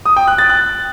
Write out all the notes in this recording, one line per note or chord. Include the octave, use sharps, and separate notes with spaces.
D#6
G5
F#6
A6
F#6